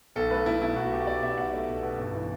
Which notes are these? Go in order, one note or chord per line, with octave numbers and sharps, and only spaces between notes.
B1 A4
A3 B4
B1 E4
B2 E4
B1 F#4
A3 G4
B1 D5
B2 E5
B1 F#5
A3 D5
B1
B2
G1
E3